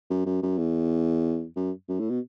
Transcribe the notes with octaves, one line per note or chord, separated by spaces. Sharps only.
F#2
F#2
F#2
E2
F#2
F#2
A2
B2